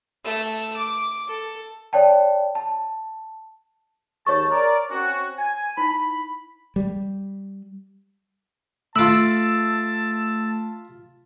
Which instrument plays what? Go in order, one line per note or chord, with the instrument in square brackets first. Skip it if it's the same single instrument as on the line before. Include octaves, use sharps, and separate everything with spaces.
[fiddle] A3 E6
D6
A4
[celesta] C#5 D5 G5 A5
A5
[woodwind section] D#2 G#2 A5 [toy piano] C#5 C#6
[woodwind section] A#4 D5
C4 C#4 F#4
G#5
[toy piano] D#4 E4 [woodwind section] B5
[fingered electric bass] G3
[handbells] A3 D7 [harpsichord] F4 B5 [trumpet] A5 [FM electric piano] E6